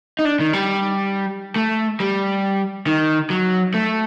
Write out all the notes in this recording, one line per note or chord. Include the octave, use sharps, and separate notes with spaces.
D#4
D4
D#3
G3
A3
G3
D#3
F#3
A3